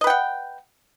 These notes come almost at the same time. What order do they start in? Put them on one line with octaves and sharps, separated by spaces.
D#5 B4 G5 F#5